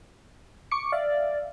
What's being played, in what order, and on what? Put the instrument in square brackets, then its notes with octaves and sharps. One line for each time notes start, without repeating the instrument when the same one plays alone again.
[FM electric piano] C#6 D6 C#7
[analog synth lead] D5 [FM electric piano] E5 F5